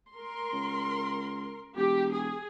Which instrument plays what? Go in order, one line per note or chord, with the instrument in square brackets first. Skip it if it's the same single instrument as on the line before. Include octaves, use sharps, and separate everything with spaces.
[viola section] A#4 C6
[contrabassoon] C#2
[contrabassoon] E1 [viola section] G4
[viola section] G#4